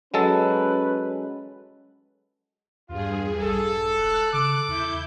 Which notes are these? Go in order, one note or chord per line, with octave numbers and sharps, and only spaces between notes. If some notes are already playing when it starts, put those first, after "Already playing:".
F#3 G#3 C#4 A4 B4
E2 G2 F4 G#4
A#1 A4
E1 F#6
C#3 A4 D6
E2 E4 G6